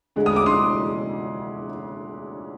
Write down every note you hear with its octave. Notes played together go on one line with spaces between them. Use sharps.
D2 D3 G#3
D#6
D6
C6 D#6